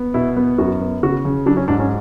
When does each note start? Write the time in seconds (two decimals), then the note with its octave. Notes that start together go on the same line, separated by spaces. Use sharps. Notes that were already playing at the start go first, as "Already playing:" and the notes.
Already playing: B3
0.14 B2 E4
0.37 B3
0.58 F#2 F#4
0.81 B3
1.03 C#3 F#4
1.25 C#3
1.46 F#3 D4
1.57 C#4
1.68 G#2 D4
1.80 C#4